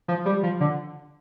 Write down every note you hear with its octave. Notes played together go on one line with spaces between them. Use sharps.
F3
G3
F3
D3